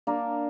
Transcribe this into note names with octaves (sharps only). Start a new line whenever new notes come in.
A#3 D4 A#4